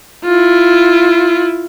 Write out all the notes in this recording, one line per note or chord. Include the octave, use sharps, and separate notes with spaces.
E4 F4